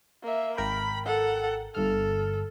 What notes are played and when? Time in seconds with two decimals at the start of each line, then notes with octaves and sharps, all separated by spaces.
0.23 A#3 E5
0.57 G#1 A#4 G5 B5
1.06 A4 F#5
1.75 G1 G2 A4 F6